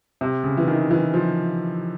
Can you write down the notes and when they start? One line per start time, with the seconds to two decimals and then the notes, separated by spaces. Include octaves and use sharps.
0.21 C3
0.44 C#3
0.57 E3
0.67 D#3
0.91 E3
1.14 F3